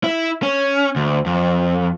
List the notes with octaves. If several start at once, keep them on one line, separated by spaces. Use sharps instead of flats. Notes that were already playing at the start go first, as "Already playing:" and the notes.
E4
C#4
D2
F2